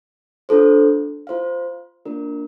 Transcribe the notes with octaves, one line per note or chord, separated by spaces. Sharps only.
D4 F4 A4 C5
F4 C5 F5
A#3 D4 F4 A#4 D5